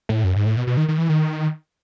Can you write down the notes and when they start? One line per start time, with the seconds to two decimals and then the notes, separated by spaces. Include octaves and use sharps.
0.09 A2
0.24 F#2
0.36 G#2
0.46 A2
0.57 B2
0.67 B2
0.77 D#3
0.88 D#3
0.98 E3
1.09 D#3